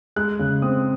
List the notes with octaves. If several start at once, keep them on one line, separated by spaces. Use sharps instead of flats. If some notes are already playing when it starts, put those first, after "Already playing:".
G#3 F#6
C#3
C4 D#6